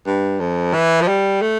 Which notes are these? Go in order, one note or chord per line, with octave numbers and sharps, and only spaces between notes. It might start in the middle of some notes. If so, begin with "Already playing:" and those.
G2
F2
E3
F3
G3
A3